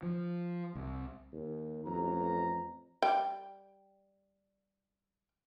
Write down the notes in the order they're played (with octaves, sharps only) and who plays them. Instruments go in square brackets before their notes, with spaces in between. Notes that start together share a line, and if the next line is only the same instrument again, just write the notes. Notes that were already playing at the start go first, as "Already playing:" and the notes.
[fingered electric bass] F3
C2
[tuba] D#2
[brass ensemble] A1 A#5 [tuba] F2
[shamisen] G3 G5